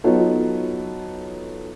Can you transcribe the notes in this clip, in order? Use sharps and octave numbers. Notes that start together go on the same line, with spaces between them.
F#3 B3 D#4 F4 A4 C#5